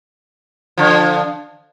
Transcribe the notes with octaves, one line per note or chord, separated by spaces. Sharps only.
D3 F3